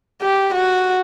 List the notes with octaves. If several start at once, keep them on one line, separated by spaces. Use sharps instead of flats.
G4
F#4